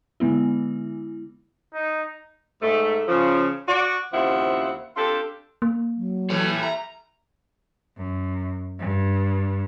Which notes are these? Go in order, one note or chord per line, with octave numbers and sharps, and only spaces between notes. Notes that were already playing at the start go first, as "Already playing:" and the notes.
D3 G#3 B3 E4
D#4
G#2 A3
C#3 F3
F#4 D5
D#2 C#3 F3 C4 E4 F#5
C4 D4 F4 G4 A4
A#3
F#3
E3 G3 A3 A4 C#5
E5 A#5
F#2
G2